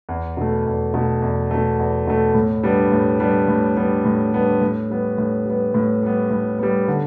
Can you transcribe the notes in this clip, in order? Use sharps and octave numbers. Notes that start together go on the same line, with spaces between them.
E2
B2 A3
E2
B2 A3
E2
B2 A3
E2
B2 A3
A2
G3 B3 D4
A2
G3 B3 D4
A2
G3 B3 D4
A2
G3 B3 D4
A2
G3 B3
A2
G3 B3
A2
G3 B3
A2
G3 B3
D3